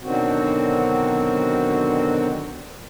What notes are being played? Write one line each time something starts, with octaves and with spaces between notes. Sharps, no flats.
B2 D3 D#3 F#3 C4 F#4